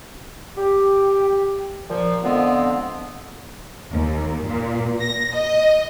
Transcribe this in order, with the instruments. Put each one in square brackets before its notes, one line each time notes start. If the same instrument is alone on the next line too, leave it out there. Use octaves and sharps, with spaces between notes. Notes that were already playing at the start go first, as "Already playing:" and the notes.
[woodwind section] G4
A#2 F3
D3 F3 G#3 B3 C4
[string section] D#2
A#2
A#6
D#5